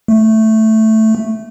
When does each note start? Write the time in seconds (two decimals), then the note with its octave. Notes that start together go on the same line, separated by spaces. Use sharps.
0.08 A3